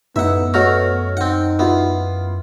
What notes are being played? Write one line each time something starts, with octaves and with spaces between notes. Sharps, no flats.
F#2 A2 B3 D#4 E4 E5 F#5
A3 B3 F#4 C#5 D#5 F6
C4 D#4 F#5
B3 E4 F4